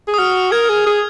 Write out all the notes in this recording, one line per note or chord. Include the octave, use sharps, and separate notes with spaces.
G#4
D#6
F#4 F6
A#4 G#6
G#4
G#4